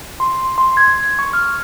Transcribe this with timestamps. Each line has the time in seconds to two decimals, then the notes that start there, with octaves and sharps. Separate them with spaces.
0.20 C6
0.58 C6
0.77 G#6
1.19 C#6
1.33 F6